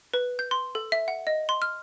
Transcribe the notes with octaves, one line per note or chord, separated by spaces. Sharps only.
B4
G6
C6
A4
E5
F#5
D#5
C6
F6